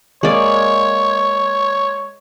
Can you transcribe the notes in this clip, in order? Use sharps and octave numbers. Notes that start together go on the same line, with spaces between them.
G#3 A#3 C#5 D5